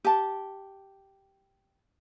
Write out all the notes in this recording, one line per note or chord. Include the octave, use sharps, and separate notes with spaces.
G4 A5